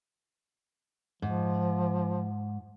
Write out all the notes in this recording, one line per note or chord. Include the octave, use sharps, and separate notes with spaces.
G#2 F3